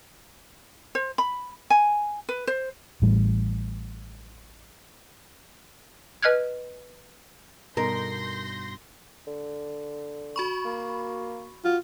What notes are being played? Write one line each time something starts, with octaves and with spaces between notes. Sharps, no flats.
C5
B5
G#5
B4
C5
A1 A2 G3
B4 D#5 F6 F#6 G#6
G2 B2 D#4 A#4 C6 G6 A#6
D3
F#4 B5 C#6
A#3
F4 F#4